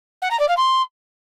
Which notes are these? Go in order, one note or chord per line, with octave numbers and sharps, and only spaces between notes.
F#5
A#5
D5
F5
C6